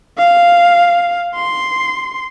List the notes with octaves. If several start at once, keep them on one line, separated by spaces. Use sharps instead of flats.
F5
C6